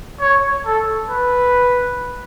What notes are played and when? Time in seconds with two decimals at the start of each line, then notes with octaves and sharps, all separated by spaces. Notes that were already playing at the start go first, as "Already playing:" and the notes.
0.20 C#5
0.66 A4
1.10 B4